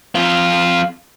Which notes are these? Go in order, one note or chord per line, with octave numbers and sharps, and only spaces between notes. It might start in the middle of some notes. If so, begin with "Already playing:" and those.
F2 F4